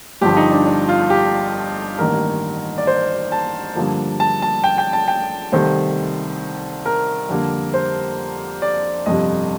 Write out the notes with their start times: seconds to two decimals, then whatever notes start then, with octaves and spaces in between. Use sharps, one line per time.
0.21 G1 G2 D3 F3 G4
0.37 D#4
0.52 D4
0.67 D4
0.89 F4
1.10 G4
1.99 A1 G2 D#3 A#3 A#4
2.78 D5
2.87 C5
3.32 A5
3.75 G2 D3 F3 A#3
4.20 A5
4.42 A5
4.64 G5
4.78 G5
4.93 A5
5.08 G5
5.52 C2 C3 D#3 A3 C5
6.86 A#4
7.29 F2 D3 G3 A#3
7.74 C5
8.62 D5
9.06 G1 F2 C3 D#5